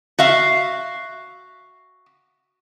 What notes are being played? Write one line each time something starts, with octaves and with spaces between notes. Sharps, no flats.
F#4 E5 F5